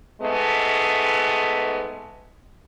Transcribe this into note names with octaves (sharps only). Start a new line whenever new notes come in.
G#2 G#3 A3 B3